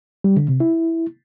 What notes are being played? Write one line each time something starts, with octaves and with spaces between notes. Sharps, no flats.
G3
D3
C3
E4